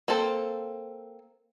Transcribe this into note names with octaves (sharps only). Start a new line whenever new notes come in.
A#3 C4 A4 C5